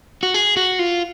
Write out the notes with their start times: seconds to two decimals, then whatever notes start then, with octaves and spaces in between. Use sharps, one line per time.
0.23 F#4
0.34 G#4
0.57 F#4
0.79 F4